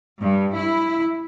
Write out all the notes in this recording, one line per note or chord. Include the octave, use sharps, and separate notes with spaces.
G2
E4